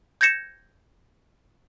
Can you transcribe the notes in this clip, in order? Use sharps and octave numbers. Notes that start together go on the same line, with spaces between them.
G6 G#6 A#6 C#7 E7